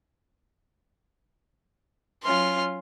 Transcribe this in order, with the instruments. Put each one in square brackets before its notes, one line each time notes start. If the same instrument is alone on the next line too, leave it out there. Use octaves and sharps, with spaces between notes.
[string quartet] F#3 C#4 F4 [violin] C6 F6